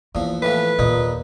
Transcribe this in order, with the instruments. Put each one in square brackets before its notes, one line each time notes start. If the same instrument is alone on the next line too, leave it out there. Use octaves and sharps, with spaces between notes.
[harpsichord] E2 F3 [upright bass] A#3
[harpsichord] A2 E3 F3 [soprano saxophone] B4
[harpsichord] A#1 D#4 [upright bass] D#2 A#2